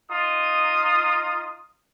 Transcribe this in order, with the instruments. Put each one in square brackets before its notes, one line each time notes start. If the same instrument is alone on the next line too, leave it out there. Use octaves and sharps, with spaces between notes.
[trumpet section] D#4 F4 D#6